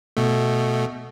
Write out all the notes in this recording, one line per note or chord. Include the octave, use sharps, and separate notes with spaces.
B2 A3